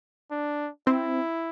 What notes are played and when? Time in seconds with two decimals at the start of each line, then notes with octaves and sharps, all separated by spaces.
0.31 D4
0.87 C4 E4